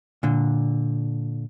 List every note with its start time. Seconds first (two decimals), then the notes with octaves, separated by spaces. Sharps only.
0.23 A#2 D3